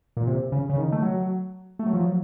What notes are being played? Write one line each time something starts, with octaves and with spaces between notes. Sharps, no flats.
A#2
C3
C#3
C#3
D#3
A3
F#3
A3
F#3
F3
F#3